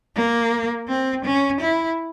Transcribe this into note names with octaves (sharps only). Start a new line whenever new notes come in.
A#3
C4
C#4
E4